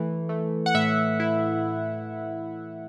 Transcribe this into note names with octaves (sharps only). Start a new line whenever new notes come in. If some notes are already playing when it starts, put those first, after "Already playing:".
Already playing: E3 A3
A3
F#5
A2 E5
E4